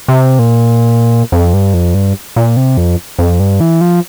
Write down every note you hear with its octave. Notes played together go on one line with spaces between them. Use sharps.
C3
A#2
F2
G2
F2
G2
A#2
C3
F2
F2
G2
E3
F3